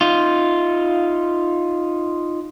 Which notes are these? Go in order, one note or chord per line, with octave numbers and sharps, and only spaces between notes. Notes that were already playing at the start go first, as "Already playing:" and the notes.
D#4 F4